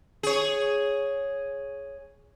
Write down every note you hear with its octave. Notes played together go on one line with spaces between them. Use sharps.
G#4 C#5